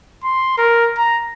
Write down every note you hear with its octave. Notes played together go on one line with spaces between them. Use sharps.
C6
A#4
A#5